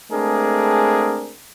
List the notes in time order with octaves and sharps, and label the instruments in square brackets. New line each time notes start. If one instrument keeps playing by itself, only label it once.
[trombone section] G#3 A3 C4 D4 G#4 A#4